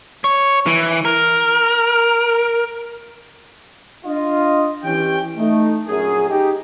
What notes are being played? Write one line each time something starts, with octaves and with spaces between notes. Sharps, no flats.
C#5
E3
A#4
D4 F4 D#5
E3 C#4 G4 G5
A3 D#4
A#1 F#2 G#4
D#4 G4